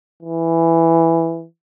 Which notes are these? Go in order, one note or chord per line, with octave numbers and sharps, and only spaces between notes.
E3